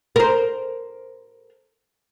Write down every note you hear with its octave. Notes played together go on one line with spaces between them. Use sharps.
A#4 C5